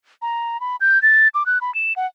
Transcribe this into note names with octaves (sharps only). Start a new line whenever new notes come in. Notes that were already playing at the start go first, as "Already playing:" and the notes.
A#5
B5
G6
A6
D6
F#6
B5
E7
F#5